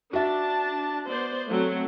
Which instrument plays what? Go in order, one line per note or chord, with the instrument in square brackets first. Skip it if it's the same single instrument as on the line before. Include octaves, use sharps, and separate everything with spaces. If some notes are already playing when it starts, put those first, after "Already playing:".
[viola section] D4 A5 [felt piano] F#4 E5
[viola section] B3 C5 D5
F#3 A3 C4